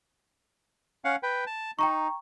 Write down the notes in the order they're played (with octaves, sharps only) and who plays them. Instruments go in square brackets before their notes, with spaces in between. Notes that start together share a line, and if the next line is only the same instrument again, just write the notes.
[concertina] C#4 F5 F#5
B4 G5
A5
[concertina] D#4 [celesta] G5 A#5 C#6